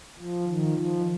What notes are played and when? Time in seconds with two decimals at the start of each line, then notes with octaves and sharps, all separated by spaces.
0.19 F3
0.48 D#3
0.76 F3